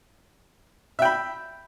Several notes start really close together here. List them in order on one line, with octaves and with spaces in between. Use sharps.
E5 G5 B5